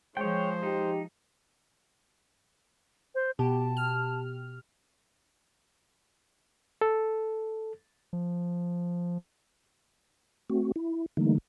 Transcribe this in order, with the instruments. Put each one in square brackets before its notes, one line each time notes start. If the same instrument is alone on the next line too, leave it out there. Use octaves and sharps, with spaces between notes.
[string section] F3 G#3 [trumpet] C5 [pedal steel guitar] C#5 G5
[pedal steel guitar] D#4 [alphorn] G4
[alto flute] C5
[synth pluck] B2 G4 [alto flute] A5
[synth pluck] F6
[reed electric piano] A4
[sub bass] F3
[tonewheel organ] A3 C4 F#4
E4
D3 E3 G3 A3 A#3 D#4